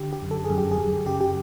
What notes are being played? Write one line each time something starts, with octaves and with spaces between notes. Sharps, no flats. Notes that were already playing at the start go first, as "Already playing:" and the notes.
Already playing: D3 G4
G4
F#2
A4
G#4
F#2
G4
G#4
F#2
C#3 G4
G4